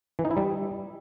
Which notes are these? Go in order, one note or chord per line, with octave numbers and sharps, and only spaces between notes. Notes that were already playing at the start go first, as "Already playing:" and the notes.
E3
D#4
E4
G3